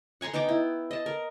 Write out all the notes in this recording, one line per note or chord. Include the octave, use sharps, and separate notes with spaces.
F#5 G#5 A#5 C6
B3 D#4 G5 D6
E4
D#5 A5
A#4